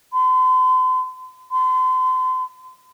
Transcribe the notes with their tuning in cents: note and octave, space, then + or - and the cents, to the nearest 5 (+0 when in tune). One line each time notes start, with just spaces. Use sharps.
C6 -45
C6 -40